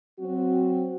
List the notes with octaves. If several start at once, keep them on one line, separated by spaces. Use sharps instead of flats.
F#3 C4 F#4